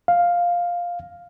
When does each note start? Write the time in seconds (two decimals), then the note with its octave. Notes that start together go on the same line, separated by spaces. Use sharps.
0.08 F5